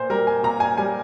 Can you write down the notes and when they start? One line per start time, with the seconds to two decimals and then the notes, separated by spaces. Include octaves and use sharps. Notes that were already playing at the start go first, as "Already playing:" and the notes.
Already playing: A#2 C5
0.10 G3 A#4
0.27 G#5
0.43 A#2 A#5
0.60 G#5
0.77 G3 G#5